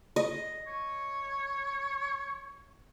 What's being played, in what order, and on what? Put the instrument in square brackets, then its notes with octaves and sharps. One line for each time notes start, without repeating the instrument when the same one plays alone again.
[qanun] D#5
[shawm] C#5